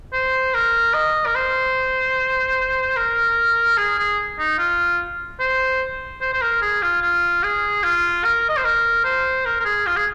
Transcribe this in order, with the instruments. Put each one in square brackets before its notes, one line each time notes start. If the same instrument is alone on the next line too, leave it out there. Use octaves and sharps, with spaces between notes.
[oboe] C5
A#4
D#5
A#4
C5
A#4
G#4
G#4
D#4
F4
C5
C5
C5
A#4
G#4
F4
F4
G#4
F4
A#4
D#5
C5
A#4
C5
A#4
A#4
G#4
F4
G#4